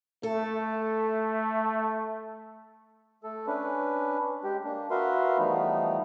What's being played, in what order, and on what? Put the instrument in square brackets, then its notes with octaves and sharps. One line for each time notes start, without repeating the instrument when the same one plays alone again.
[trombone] A3 [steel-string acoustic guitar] A4
[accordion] A3 A4
C#4 D4 B4
G#3 G4
A#3 D4
F#4 A#4 B4 E5 F5 C6
E3 F3 G3 A3 B3 D#4